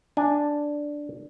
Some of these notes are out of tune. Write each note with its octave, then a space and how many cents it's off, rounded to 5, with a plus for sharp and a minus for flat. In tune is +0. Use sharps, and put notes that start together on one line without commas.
D4 +0 G#5 +0